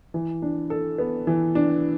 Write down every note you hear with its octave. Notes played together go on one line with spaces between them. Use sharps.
E3
D4
A4
B3
E3
D4